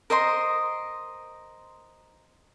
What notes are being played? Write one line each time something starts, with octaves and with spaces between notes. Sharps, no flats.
A#4 C5 D#5 C6